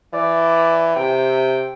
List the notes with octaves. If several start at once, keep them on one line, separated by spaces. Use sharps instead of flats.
E3 D5
C3 G5